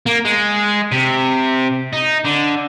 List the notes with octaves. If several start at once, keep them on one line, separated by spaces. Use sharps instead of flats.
A#3
G#3
C3
D#4
D3